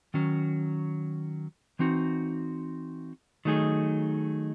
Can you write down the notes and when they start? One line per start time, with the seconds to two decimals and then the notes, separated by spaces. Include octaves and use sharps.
0.14 D#3 F#3 C#4
1.79 E3 C4 D#4 F#4
3.45 D#3 F#3 A3 D#4 G#4